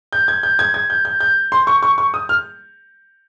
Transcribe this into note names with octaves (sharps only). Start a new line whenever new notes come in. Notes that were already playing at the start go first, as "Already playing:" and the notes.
G6
G#6
G6
G#6
G#6
G6
G6
G6
C6
C#6
C#6
C#6
D#6
F6